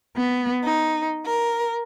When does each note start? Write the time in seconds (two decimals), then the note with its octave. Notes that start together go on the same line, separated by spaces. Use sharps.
0.18 B3
0.64 D#4
1.26 A#4